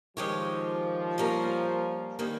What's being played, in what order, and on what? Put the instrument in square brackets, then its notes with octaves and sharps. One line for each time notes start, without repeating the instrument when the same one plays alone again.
[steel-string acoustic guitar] D#3 G#3 C#4 G4 C#5 [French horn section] F3
[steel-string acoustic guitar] G3 A#3 C#4 F4 A#4
D#3 G3 A#3